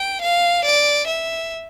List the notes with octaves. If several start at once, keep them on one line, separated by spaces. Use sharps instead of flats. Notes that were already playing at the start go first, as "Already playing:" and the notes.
Already playing: G5
F5
D5
E5